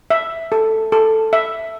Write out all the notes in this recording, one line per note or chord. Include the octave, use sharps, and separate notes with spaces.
E5
A4
A4
E5